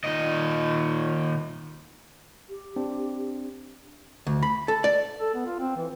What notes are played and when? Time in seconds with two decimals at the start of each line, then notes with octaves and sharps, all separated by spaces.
0.04 A#2 D#3 D#5
2.50 G4
2.76 C4 D4
4.27 D2
4.43 B5
4.68 A4
4.84 D5
5.20 A4
5.34 B3
5.46 F4
5.59 C4
5.76 E3